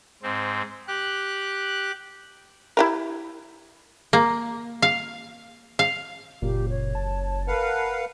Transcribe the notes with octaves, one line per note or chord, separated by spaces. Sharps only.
G#2 C4
G4 F#6
E4 G4 A#4
A#3
F5
F5
F#1 A#2 G4
C#5
A5
A#4 B4 F5 F#5